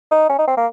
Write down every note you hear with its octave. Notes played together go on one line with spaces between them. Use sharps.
D#4
C#4
D#4
C4
A#3